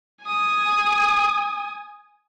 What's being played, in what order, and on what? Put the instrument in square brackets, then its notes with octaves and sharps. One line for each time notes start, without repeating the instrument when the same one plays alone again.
[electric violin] G#5 D#6